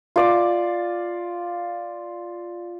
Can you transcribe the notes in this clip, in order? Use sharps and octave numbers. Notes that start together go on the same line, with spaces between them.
F4 D5 D6